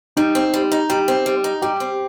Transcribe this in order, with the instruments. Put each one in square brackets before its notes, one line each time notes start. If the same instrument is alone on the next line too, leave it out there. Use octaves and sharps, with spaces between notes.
[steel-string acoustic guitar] G3 [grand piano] D#4
[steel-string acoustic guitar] C4
G3
D#4
[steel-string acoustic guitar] G3 [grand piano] G4
[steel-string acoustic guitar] C4
G3
D#4
[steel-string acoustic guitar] G3 [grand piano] G4
[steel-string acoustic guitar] C4